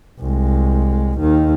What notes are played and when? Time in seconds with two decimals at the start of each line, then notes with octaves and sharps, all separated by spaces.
0.20 C2 G#3
1.20 D#2 D#3